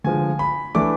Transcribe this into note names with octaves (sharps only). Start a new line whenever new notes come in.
D3 F3 G#3 G#5
B5
E3 A3 D4 D6